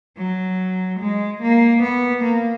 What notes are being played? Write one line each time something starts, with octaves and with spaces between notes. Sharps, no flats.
F#3
G#3
A#3
B3
A#3